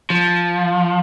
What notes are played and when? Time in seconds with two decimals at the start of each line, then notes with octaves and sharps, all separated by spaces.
0.10 F3